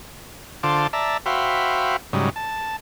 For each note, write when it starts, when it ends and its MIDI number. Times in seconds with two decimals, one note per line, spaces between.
0.63 0.87 50
0.63 0.87 65
0.63 0.87 72
0.63 0.87 81
0.63 0.87 86
0.93 1.17 74
0.93 1.17 76
0.93 1.17 81
0.93 1.17 82
1.26 1.97 66
1.26 1.97 72
1.26 1.97 76
1.26 1.97 77
1.26 1.97 79
1.26 1.97 83
2.13 2.30 44
2.13 2.30 49
2.13 2.30 54
2.13 2.30 55
2.36 2.76 81